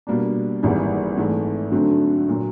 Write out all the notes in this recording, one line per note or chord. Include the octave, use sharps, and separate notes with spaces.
B2 G3 A#3 D4
G#1 G#2 E3 G3 A#3
G#2 E3 A3
G2 D3 F#3 A3 C4
A#2 F#3